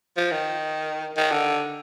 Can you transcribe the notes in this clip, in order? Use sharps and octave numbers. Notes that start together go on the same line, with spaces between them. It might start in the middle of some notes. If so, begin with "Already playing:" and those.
F3
D#3
D#3
D3